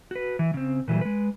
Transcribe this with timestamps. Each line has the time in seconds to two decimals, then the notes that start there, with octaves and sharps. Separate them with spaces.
0.11 F#4 B4
0.39 E3
0.54 C#3 C4
0.88 A#2 E3 F#3 G3
1.01 G#3 B4